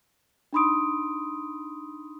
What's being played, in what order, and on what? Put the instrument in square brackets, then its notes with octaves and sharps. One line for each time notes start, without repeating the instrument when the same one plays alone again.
[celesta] D4 D#4 B5 C6 D#6 D7